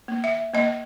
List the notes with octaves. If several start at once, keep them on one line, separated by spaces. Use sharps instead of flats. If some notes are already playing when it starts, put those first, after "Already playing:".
A#3
E5
A#3 D#5